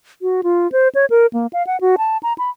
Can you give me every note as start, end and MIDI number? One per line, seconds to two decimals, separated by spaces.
0.22 0.41 66
0.43 0.70 65
0.72 0.88 72
0.95 1.06 73
1.10 1.26 70
1.33 1.47 58
1.53 1.65 77
1.67 1.80 78
1.81 1.96 66
1.98 2.17 81
2.23 2.33 82
2.38 2.50 83